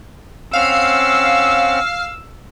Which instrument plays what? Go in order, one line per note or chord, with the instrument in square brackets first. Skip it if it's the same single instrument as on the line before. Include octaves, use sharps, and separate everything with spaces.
[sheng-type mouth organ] C4 C#4 F#5 [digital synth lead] F5 [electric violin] E6